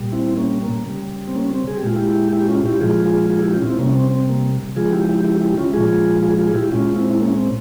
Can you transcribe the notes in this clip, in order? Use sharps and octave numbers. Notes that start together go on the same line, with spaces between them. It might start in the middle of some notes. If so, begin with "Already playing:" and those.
Already playing: A#2 G3
C4 E4
A#3 C#4
A#3
C#3 G3
C4
A#3 C#4
C4
G#4
G4
A#2 G#3 F4
E4 G4
E4 G4
C#4 F4
E4 G4
A#2 F3 G#3 F4 G#4
F4 G#4
F4 G#4
E4 G4
C#4 F4
C4 E4
C3 G3 A#3 C#4
C4
C4
A#3
C#3 F3 G#3 F4 G#4
E4 G4
E4 G4
E4 G4
E4 G4
C#4 F4
A#2 F3 G#3 F4 G#4
F4 G#4
F4 G#4
F4
E4 G4
A#2 G#3 C#4 F4
C4 E4
E4
A#3 C#4
C4